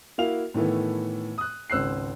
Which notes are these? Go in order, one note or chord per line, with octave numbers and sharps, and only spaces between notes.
A#3 E4 F#4 F5 F7
A2 D#3 E3 A3 B3
D#6 F#6
G#1 C#2 C5 E6 F#6 C7